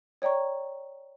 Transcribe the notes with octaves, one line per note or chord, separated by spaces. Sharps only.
C#5 D5 G5 A#5 C#6